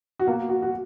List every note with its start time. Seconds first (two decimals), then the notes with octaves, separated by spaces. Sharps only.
0.19 F#4
0.27 B2 A#3 F4
0.49 F#4
0.62 F#4